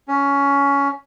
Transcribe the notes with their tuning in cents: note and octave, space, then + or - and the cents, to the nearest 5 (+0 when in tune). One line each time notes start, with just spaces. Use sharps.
C#4 +15